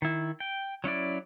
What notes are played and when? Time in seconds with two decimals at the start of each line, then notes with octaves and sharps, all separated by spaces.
0.02 D#3 E4
0.40 G5
0.84 F#3 C#4 E4 D5